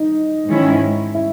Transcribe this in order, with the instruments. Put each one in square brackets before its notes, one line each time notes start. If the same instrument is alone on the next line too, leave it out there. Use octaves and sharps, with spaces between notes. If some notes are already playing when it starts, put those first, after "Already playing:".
Already playing: [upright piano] D#4
[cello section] G#2 D#3 G#3 C#4 E4
[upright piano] E4